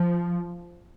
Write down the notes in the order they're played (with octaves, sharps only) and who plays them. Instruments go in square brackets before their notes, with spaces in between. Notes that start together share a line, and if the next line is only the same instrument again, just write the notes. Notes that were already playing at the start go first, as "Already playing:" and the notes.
Already playing: [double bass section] F3